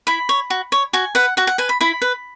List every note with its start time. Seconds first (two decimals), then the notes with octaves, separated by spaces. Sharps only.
0.07 E4 B5
0.29 C#5
0.50 F#4
0.72 C#5
0.93 F#4 G#5
1.15 B4 F#5
1.37 F#4 F#5
1.47 F#5
1.58 B4 G#5
1.69 B5
1.81 E4 B5
2.02 B4